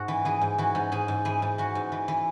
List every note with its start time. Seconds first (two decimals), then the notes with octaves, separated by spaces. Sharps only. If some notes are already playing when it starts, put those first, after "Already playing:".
Already playing: G#2 F#4
0.08 E3
0.25 E3 G#4
0.41 G#2
0.58 E3 F#4
0.75 G#2
0.92 G#2 G#4
1.08 G#2
1.25 E3 G#4
1.42 G#2
1.58 E3 F#4
1.75 G#2
1.92 E3
2.08 E3